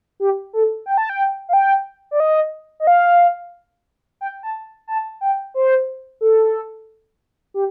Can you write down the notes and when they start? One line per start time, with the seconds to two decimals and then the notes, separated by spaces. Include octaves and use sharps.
0.20 G4
0.53 A4
0.86 G5
0.98 A5
1.09 G5
1.49 F5
1.53 G5
2.11 D5
2.20 D#5
2.80 D#5
2.87 F5
4.21 G5
4.43 A5
4.88 A5
5.21 G5
5.54 C5
6.21 A4
7.54 G4